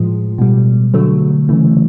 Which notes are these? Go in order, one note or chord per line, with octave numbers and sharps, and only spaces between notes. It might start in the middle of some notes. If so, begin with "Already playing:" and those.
Already playing: A2 F3 G#3
B2 G3
D3 F#3 A3
C#3 E3 A3